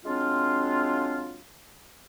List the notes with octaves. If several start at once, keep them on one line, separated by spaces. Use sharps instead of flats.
F#3 G#3 C4 D4 F4